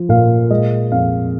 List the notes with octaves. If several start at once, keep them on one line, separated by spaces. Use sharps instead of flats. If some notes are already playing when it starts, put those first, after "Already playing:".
Already playing: F3
A#2 F5
G#3 D#5
F2 F5